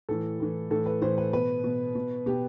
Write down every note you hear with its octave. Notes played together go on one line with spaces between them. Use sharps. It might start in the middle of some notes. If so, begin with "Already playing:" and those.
A2 E3 A4
A2 E3
A2 E3 A4
B4
A2 E3 C5
B4
B2 B4
B2
B2
B2 G4